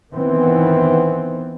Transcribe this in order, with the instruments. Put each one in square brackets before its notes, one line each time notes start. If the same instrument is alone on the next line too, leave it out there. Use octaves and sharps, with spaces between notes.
[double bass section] D#3 E3 B3 C4